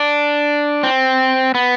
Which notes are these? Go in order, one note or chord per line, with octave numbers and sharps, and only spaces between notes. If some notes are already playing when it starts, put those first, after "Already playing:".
Already playing: D4
C4
B3